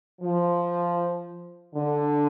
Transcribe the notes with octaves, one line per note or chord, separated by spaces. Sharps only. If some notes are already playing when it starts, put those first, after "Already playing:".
F3
D3